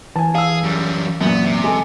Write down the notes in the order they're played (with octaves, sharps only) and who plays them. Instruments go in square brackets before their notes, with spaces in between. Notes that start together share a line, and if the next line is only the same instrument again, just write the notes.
[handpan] E3 [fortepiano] G#5 A5
[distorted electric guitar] G#4 [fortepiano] F5 E6
[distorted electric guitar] F#2 G3
[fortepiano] F#2 A#2 [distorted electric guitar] B3
[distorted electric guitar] C3
[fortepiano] G#3 A4